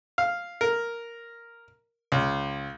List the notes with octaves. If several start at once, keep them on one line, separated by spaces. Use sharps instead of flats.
F5
A#4
C#2